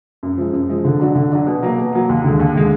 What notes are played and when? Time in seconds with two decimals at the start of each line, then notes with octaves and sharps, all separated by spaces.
0.23 F#2
0.38 F3 G#3
0.53 F#2
0.69 F3 G#3
0.85 D3
0.99 F#3 D4 F#4
1.15 D3
1.31 F#3 D4 F#4
1.47 B2
1.63 F#3 A#3
1.78 B2
1.93 F#3 A#3
2.09 D#2
2.24 D3 G#3
2.40 D#2
2.55 D3 G#3